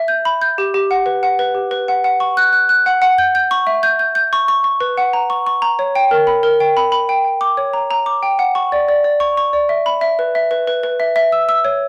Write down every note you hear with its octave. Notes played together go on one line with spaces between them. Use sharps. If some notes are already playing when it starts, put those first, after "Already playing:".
Already playing: E5
G6
B5
G6
G4
G4
F#5
B4
F#5
B4
G4
B4
F#5
F#5
C#6
F#6
F#6
F#6
F#5
F#5
G6
G6
C#6
E5
G6
G6
G6
C#6
C#6
C#6
B4
F#5
A#5
C#6
C#6
A#5
C#5
G5
A#4
B5
A#4
G5
B5
B5
G5
G5
D6
C#5
A#5
A#5
D6
G5
F#5
C#6
D5
D5
D5
C#6
C#6
D5
E5
B5
E5
B4
E5
B4
B4
B4
E5
E5
E6
E6
C#5